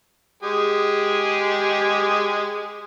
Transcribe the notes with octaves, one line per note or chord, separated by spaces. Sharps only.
G#3 G4 G#4